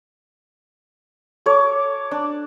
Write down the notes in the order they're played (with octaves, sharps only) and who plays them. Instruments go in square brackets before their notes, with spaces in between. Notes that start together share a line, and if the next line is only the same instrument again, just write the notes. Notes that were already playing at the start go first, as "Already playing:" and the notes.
[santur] A4 C#5 [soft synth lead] D6
[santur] D4